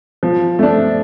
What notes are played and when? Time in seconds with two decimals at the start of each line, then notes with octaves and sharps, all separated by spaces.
0.23 F3
0.59 A3 D4